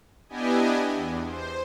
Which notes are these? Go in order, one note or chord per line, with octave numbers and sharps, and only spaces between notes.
B3 D4 E4 G4 D#5 G#5
E2
C5